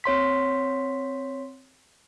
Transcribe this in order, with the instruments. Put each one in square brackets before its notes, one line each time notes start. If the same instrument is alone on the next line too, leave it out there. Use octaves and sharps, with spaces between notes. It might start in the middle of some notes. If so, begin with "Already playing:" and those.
[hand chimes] C4 C#5 C6 B6